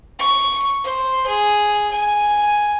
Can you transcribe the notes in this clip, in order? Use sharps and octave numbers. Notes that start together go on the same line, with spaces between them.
C#6
C5
G#4
G#5